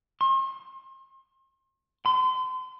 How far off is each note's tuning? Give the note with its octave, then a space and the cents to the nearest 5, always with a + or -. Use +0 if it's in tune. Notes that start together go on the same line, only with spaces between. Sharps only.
C6 +40
C6 -35